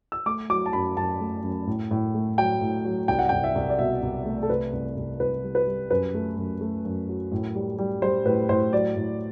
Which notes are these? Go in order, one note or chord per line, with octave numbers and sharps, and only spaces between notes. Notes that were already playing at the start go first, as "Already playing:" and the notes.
E6
A3 D6
F#3 D6
A5
F#2 B5
F#2 A5
A3
F#2
A2
A2
A3
F#3 G5
A2
F#3
C2 G5
F#5
G5
C2
E5
C2
D5
B2 E5
C2
A3
A4
C3 B4
C2
C2
C2 B4
G3
B4
G3
F#2 B4
A3
F#2
A3
F#2
F#3
A2
G3
G3
G3 C5
A2 B4
A2 C5
F#3 D5
A2